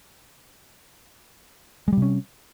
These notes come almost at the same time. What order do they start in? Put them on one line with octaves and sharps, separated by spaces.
G#3 G3 C3 C#4